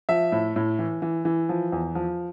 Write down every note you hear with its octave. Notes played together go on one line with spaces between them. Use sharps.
F3 E5
A2
A2
E3
E3
E3
F3
E2
F3